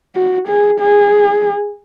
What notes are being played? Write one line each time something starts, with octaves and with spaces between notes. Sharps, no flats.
F#4
G#4
G#4